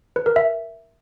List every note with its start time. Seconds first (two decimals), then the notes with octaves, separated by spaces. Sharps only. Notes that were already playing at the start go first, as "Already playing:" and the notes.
0.16 B4
0.26 A#4
0.36 E5